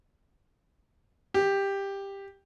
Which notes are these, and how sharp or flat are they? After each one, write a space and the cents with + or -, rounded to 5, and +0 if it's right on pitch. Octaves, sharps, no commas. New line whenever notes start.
G4 +10